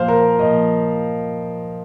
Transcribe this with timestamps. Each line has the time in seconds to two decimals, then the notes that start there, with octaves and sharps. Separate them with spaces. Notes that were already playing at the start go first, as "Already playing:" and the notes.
Already playing: A#2 F3 C5 F5
0.08 A#4
0.39 A#2 F3 D#5